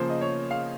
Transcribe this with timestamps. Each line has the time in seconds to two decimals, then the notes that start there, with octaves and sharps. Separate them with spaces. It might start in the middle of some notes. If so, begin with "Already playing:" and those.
Already playing: C#3 F3 A#3 C5
0.10 D#5
0.21 C#5
0.51 F5